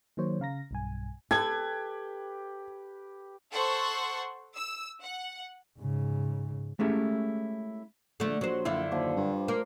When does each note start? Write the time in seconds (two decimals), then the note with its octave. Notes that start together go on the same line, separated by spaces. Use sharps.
0.17 D#3 F#3 A#3 C5 C#5
0.40 C#3 F5 A#5 A#6
0.71 B1 G2 G#5
1.31 G4 A4 B4 G#6
3.53 A4 C5 F#5 C6 C#6
4.55 E6
5.02 F#5
5.79 G#2 C#3
6.79 G#3 A3 C#4 E4 G4
8.20 A#1 D3 A3
8.41 A#1 F#3 C5
8.65 F#2 D3 E4 F4
8.91 D#2 F3 C5 D5
9.16 G2
9.48 A#3 C5 A#5